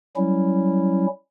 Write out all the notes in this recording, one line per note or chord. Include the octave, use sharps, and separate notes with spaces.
F#3 G3 C#4 E4